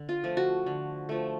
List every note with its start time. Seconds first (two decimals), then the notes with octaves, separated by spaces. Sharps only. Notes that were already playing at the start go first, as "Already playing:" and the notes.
Already playing: D3
0.09 F4
0.24 F3 A3
0.37 F#4
0.66 D3
1.09 F3 A3